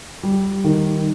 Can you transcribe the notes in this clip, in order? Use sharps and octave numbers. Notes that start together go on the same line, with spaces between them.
G3
D#3